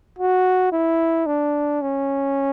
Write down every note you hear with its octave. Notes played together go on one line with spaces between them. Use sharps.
F#4
E4
D4
C#4